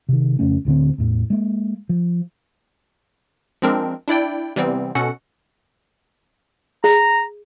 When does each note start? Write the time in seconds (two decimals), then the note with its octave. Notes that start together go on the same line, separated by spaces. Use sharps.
0.09 C3 D#3
0.39 F2 C#3 A3 C#4
0.65 D1 D2 D3 C4
0.98 E2 A2
1.30 G#3 A#3
1.89 F3
3.62 F3 G#3 C4 D4 A#4
4.08 D4 E4 D5 G5
4.56 C3 E3 G3 B3 C4
4.95 B2 C#4 F#4 A4 F#5 C#7
6.84 G#4 A#5